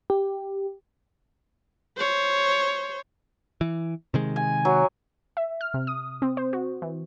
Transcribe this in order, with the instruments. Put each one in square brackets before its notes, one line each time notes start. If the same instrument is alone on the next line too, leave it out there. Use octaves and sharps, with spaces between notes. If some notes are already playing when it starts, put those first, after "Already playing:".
[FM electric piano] G4
[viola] C5 C#5
[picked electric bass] E3
C3 D#3 G#3
[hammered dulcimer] G#5
F#3
[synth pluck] E5
F6
C3
D#6
C4
C5
F#4
E3